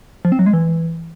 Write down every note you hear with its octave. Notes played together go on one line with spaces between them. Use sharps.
F3
C4
F#3
G#3
E3